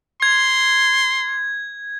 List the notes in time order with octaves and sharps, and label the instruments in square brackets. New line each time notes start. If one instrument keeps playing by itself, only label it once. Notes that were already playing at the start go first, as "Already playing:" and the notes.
[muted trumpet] C6 [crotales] G#6